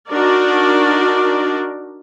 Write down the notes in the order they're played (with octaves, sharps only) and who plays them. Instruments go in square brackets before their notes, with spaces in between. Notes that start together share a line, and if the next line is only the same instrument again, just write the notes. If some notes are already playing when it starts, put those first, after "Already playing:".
[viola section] D4 D#4 F#4 A#4 D5